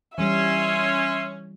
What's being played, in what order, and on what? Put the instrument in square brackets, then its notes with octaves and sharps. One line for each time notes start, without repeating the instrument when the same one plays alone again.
[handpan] E3 G3 [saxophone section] C#4 [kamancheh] E5 C6